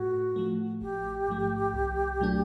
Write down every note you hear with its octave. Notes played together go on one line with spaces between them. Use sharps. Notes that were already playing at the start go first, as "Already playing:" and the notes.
Already playing: A2 F#4
F3 A3
A1 G4
G#2 F3 A3
C2
A#2 F#3 A3 D4